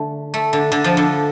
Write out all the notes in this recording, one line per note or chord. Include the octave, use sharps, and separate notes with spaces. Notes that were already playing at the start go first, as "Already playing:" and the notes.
Already playing: D3 A3
A3
D3
D3
F3
D3